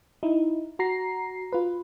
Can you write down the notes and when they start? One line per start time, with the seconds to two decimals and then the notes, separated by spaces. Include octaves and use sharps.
0.23 D#4 E4
0.79 F#4 A#5 C7
1.52 F4 B4